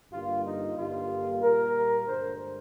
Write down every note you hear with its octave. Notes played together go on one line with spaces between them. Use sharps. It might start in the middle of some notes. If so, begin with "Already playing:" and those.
G2 D3 G3 A#3 F4
D#4
G2 D3 G3 A#3 F4
A#2 G3 A#3 A#4
G2 D3 G#3 C5